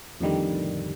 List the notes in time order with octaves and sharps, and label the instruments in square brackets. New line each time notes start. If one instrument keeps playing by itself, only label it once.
[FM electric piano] F2 A2 D3 D#3 G3